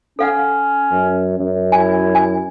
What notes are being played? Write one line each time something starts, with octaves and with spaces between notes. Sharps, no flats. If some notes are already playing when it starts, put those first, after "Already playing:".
C#4 A4 F5 F#5
F#2
F#2
E4 G#5
G#5